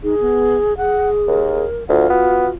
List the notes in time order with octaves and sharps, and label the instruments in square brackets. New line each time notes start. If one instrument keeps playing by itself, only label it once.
[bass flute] D#4 [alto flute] G#4
[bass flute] B3
[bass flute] G#4 [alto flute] F#5
[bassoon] D#2 [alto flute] A#4
[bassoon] D2 [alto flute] F4 [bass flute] F#5
[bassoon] B3 [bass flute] F#4